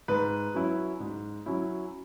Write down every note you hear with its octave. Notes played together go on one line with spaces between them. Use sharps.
G#2 B4
F#3 C#4 E4
G#2
F#3 C#4 E4